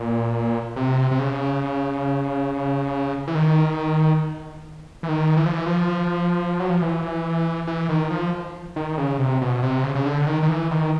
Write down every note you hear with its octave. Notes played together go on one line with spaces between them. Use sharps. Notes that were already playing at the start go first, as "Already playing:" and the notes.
Already playing: A#2
C3
C3
C#3
E3
D#3
E3
D#3
E3
F3
E3
F3
F#3
F3
E3
E3
D#3
F3
D#3
C#3
C3
B2
C3
C#3
C#3
D3
D#3
D#3
E3
D#3